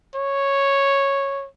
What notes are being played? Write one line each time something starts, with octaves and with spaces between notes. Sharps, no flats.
C#5